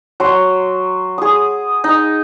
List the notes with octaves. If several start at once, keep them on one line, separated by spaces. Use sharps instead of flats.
F#3 C6
G#4 D#6
D#4